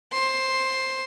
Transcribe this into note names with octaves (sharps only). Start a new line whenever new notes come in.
C5 C6